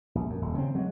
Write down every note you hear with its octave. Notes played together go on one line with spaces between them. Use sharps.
A#1
F#2
D#1
C#3 C4
F#3 G#3